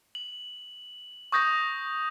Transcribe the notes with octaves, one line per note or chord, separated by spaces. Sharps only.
F#7
C#6 D#6 G6 A#6